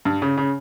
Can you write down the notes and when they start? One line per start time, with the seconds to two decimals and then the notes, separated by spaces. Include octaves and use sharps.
0.05 G2
0.22 C#3
0.37 C#3